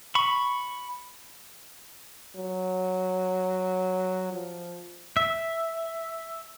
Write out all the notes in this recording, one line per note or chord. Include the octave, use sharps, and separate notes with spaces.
B5 C#6
F#3
F3
E5